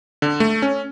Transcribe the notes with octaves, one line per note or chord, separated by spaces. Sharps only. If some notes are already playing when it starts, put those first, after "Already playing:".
D3
A3
C#4